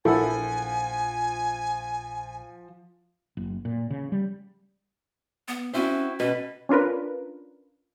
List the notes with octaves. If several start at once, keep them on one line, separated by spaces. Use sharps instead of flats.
A#1 F3 E4 A4 F#5 G#5
F#1
A#2
C#3
G3
B3
C4 C#4 E4 F#4
B2 C#4 B4
C#4 D4 F4 A#4 B4